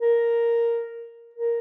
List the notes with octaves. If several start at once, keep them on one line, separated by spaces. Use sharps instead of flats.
A#4
A#4